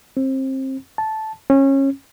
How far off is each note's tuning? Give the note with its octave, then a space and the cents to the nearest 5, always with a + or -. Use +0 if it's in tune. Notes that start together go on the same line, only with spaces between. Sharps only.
C4 +25
A5 -10
C#4 -25